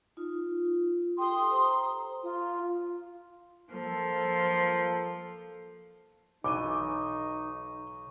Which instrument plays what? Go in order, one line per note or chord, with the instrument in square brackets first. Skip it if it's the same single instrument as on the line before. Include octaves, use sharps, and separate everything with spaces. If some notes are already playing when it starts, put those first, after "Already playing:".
[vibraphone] D#4 F4
[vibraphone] G4 A4 G5 [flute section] C6 D#6
[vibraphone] C5 A#5
[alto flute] F4
[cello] F3 [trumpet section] A#3 A4
[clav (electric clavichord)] B1 E3 [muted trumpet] D#4 [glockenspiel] G#5 C#6 D#7 [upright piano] D6